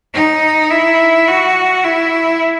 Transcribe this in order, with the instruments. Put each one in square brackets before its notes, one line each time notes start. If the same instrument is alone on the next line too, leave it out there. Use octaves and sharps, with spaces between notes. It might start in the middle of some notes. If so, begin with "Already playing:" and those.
[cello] D#4
E4
F#4
E4